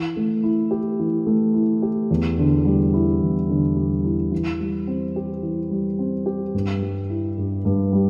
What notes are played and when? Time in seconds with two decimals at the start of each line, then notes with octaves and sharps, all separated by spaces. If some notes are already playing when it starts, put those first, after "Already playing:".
Already playing: E3
0.16 A3
0.44 E4
0.71 G4
0.99 E3
1.27 A3
1.54 E4
1.82 G4
2.11 E2
2.38 D3
2.65 G3
2.94 E4
3.21 E2
3.49 D3
3.77 G3
4.05 E4
4.32 E3
4.60 G3
4.87 C4
5.16 G4
5.43 E3
5.70 G3
5.99 C4
6.26 G4
6.54 G2
6.82 G3
7.10 E4
7.38 G2
7.65 G2
7.93 G3